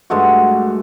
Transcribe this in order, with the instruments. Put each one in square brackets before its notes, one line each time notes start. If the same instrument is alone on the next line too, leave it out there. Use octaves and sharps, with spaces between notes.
[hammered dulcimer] G2 G#3 A3 F#4